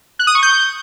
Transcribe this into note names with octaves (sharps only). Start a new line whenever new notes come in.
F#6
D#6
C#6
G6